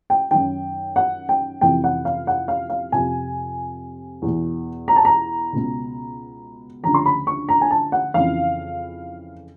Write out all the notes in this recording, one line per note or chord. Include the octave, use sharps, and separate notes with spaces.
G5
F#2 D#3 G5
F#5
G5
F2 C3 E3 G5
F#5
F5
F#5
F5
F5
F2 C3 F3 G#5
E2 B2
A#5
A5
A#5
C#2 B2
D2 C#3 F3 A#5
C6
B5
C#6
A#5
G#5
A5
F#5
F2 C#3 E3 F5